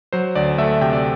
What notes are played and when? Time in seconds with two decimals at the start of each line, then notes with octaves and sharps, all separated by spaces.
0.13 F#3 C5
0.35 D2 D5
0.58 A3 E5
0.81 C3 G5
0.93 D5